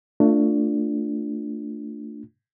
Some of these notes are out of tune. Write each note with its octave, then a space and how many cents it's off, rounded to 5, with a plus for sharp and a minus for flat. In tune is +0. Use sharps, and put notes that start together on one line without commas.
A3 +25 D4 +0 F4 +0